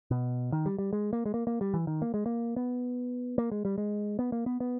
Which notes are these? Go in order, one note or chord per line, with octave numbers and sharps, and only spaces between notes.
B2
D#3
G3
G3
G#3
A#3
G#3
A#3
A#3
G3
E3
D#3
A#3
G#3
A#3
B3
A#3
G#3
G3
G#3
B3
A#3
B3
B3